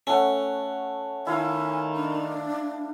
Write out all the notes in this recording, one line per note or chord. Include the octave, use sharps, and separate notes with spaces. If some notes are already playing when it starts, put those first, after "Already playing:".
A3 C#4 F#5
D#3 E4 F5 G#5
D4